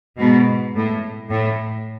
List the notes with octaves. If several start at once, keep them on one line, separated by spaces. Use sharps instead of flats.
G#2 B2
A2
A2